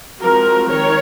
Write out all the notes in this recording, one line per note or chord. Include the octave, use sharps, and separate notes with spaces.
F3 G#3 C4 F#4 A#4
D#3 A#4 C#5